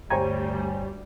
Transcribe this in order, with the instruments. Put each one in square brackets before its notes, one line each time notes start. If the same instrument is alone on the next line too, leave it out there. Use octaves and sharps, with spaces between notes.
[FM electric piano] G1 C#5 G#5 [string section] D2 G3 [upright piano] C5 G5 A#5